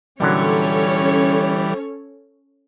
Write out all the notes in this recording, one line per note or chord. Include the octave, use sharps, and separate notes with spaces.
A#2 D3 E3 F#3 G3 C#4 A4 C#5